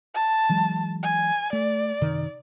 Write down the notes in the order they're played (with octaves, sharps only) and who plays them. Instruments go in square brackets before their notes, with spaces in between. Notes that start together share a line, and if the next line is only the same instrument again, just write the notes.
[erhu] A5
[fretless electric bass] E3 F#3 G#3
[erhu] G#5
[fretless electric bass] A3 [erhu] D5
[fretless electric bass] F#2 C3 D#3